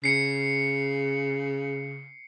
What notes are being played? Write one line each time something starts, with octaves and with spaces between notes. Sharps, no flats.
C#3 C7 C#7